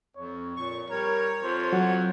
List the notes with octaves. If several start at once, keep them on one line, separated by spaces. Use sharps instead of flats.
F2 C#5
A#2 C#6
G3 A#4 C#5
F2 C5
F#3 F#5